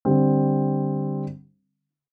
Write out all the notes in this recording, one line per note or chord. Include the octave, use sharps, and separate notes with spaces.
D3 G3 C4